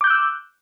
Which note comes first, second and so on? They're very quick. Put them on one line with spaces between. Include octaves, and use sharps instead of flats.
D6 G6 F#6 E6